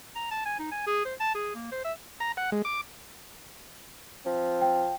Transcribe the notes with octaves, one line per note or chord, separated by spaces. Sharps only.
A#5
A5
G#5
D#4
G#5
G#4
C5
A5
G#4
A#3
C5
E5
A#5
F#5
G#3
D6
F3 C4
G5